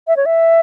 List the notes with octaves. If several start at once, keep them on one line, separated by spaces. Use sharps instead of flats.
E5
C#5
E5